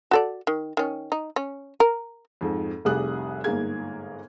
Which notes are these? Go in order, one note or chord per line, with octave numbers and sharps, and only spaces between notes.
F#4 A4 D5
D#3
D#3 C#4
D#4
C#4
A#4
F2 G#2
F1 C2 G3 G#4 D#6 F#6
G1 G#2 A#3 G#4 G#6